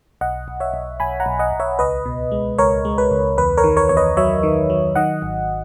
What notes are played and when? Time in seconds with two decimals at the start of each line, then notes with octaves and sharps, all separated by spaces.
0.21 B1 D#5 F#5
0.48 B1
0.60 C#5 E5
0.74 B1
1.00 B1 G#5 B5
1.20 F#5 A#5
1.26 B1
1.39 D#5 F#5
1.53 B1
1.60 C#5 E5
1.79 C#2 B4 D#5
2.06 B2
2.32 G#3
2.58 C#2 A#4 C#5
2.85 G#3
2.98 B4
3.11 C#2
3.37 E2 B4
3.57 A#4 C#5
3.64 D#3
3.77 A#4 C#5
3.89 E2 C#5
3.97 B4 D#5
4.17 F#3 C#5 E5
4.43 D#3
4.70 F#3
4.96 D#3 D#5 F#5
5.22 G#1